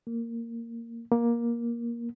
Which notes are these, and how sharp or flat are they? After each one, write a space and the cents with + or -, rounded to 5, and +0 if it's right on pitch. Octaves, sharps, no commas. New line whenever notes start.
A#3 -10
A#3 +15